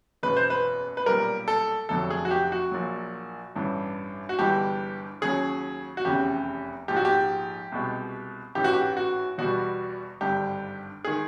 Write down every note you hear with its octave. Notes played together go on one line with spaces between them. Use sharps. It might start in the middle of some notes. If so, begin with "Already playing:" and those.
F#1 E2 B2 G#3 B4
C5
B4
B4
B1 A#2 G3 A#4
A4
F1 F2 D3 F#3 A4
G#4
F#4
G4
F#4
A#1 A#2 F#3
A1 G2 E3
F#4
G1 G2 E3 G#3 G4
D#2 C#3 F#3 G#4
F#4
F1 E2 C#3 G4
A#1 G#2 F3 G4
F#4
G4
C2 B2 G#3
A1 G#2 E3 G4
F#4
G4
F#4
E2 B2 G3 F#4
G#1 G2 D3 G4
D#3 G#3 G#4